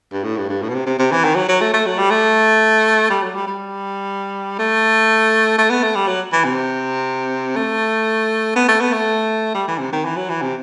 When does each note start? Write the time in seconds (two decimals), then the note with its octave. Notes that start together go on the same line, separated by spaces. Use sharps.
0.12 G2
0.24 A2
0.37 G2
0.49 G2
0.62 A2
0.69 B2
0.75 C3
0.86 C3
0.99 C3
1.12 E3
1.24 D#3
1.36 F#3
1.48 F#3
1.60 A3
1.73 A3
1.86 F#3
1.98 G3
2.10 A3
3.10 G3
3.22 F#3
3.35 G3
3.47 G3
4.59 A3
5.58 A3
5.70 B3
5.83 A3
5.95 G3
6.07 F#3
6.32 E3
6.44 C3
7.56 A3
8.56 B3
8.68 A3
8.80 B3
8.93 A3
9.54 G3
9.68 E3
9.80 C3
9.92 D#3
10.05 E3
10.16 F#3
10.29 E3
10.42 C3